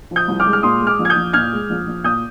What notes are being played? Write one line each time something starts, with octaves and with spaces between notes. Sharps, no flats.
F3
D#6 G6
C2
D6 F6
G#3
F6
A#2 C6 D#6
G#3
D6 F6
A#1
G#6
D#6 G6
A#1
A#2 F6 G#6
G#3
A#1
A#1
A#2 D#6 G6